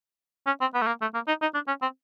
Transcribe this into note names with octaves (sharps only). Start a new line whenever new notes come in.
C#4
C4
B3
A3
A#3
A3
A#3
D#4
D#4
D4
C#4
C4